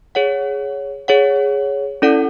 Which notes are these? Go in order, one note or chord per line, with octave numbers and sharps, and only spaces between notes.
G#4 C#5 F#5
G#4 C#5 F#5
C#4 E4 A4 D5 F#5